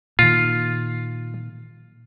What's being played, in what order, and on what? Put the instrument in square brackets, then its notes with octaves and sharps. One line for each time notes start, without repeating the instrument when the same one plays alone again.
[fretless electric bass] A#2 D#3 [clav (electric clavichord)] F4